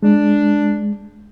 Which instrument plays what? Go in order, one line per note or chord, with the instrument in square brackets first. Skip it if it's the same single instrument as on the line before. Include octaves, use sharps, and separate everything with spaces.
[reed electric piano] G#3 [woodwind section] D4